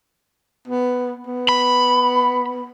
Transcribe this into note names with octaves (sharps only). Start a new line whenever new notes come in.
B3
B3
B5